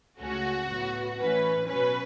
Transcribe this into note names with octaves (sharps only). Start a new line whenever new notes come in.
C#2 C#3 A3 C#4 F#4
A2 F#3 B3
A2 E3 C#4 B4
B2 F#3 C#4 B4